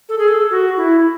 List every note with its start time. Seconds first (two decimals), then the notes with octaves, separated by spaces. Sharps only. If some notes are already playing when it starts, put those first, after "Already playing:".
0.09 A4
0.18 G#4
0.28 A4
0.50 F#4
0.77 E4